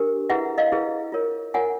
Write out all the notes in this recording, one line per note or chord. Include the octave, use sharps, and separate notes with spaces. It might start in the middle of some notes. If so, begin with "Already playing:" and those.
Already playing: D4 G4 A#4
E4 G#4 B4 E5 F#5
D#5 F5
E4 G#4 B4
F4 A#4 C#5
F4 A#4 C#5 F#5 G#5